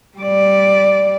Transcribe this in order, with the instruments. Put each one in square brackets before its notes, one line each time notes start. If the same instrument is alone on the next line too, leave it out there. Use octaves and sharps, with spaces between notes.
[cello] G3 D5